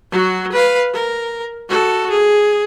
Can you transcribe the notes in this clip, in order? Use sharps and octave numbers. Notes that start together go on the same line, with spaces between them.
F#3 F#4
B4 F5
A#4
F#4 A4
G#4